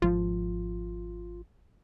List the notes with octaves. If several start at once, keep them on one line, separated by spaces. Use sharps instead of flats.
G#1 F3 F4